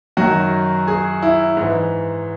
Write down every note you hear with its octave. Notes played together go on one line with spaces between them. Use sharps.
F#2 D#3 F#3 F#4
G#4
E4
G#2 E3